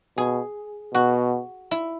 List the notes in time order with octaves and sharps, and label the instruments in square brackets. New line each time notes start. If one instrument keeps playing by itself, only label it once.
[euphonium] B2 [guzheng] G#4
[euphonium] B2 [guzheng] F#4
[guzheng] E4